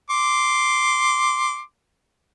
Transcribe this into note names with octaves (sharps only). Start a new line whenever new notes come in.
C6 D6